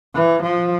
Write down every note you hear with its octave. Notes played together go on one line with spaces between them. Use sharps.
E3
F3